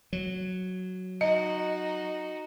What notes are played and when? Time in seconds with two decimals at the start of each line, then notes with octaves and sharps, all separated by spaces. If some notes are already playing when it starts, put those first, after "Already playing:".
0.13 F#3
1.21 D#4 F#4 D#5